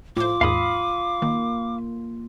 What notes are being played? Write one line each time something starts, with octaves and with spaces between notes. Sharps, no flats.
A2 F4 C5 D6
D#2 G#2 F5 B5 D#6
D#3 A#3